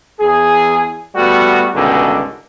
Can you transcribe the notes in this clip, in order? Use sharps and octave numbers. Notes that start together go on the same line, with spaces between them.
E2 G#4
G3 A3 B3 F#4
C#2 G2 B2 D3 D#3